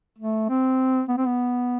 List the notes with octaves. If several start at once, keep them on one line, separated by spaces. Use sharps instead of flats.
A3
C4
B3
C4
B3